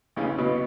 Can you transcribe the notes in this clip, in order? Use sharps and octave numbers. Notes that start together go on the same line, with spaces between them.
B1 C#3 C#4
B2 B3